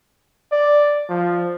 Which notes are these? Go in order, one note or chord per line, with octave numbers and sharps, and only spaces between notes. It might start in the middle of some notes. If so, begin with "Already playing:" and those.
D5
F3